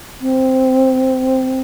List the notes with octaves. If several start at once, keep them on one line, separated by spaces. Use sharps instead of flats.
C4